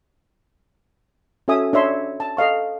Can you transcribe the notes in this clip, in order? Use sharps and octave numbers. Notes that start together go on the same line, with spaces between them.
C#4 F#4 A4 E5 G#5 D#6
D4 C#5 E5 C6
A5
A4 D#5 F5 C#6